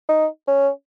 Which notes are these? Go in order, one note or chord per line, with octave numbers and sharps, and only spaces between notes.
D#4
C#4